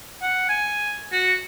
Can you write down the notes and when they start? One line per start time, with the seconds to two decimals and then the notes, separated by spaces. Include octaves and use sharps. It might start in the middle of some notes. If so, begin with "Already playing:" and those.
0.22 F#5
0.49 G#5
1.12 F#4